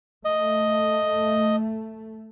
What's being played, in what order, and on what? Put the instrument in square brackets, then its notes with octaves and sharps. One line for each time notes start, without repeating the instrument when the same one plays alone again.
[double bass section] A3 [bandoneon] D#5